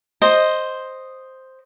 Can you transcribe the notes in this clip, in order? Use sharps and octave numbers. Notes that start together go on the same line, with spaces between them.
C5 D#5